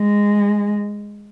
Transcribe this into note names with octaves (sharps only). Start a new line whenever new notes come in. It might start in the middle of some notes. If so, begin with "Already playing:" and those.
Already playing: G#3